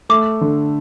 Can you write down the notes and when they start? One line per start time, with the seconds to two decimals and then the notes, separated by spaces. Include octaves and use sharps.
0.09 A3 D6
0.41 D3